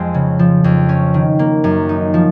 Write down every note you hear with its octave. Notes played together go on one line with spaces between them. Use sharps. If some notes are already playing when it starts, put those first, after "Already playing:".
Already playing: F2 G#3
C#3
F3
F2
C#4
D#3
A#3
F#2
D#4
F3